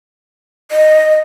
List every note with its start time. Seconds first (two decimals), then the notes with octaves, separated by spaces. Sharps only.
0.71 D#5